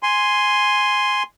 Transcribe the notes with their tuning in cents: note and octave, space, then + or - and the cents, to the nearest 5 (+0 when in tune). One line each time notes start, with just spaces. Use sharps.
G#5 +0 C6 +0